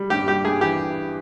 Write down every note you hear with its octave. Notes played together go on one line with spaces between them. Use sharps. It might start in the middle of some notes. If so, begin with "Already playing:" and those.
Already playing: G3
G2 G4
G3 G4
G2 G#4
E3 G4